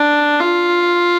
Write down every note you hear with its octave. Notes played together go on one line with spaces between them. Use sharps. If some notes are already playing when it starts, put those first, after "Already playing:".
Already playing: D4
F4